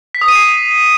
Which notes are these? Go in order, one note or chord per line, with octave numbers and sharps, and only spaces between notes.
B6
D#6
D#7
C7